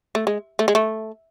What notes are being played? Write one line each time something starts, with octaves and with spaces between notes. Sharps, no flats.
A3
G#3
A3
G#3
A3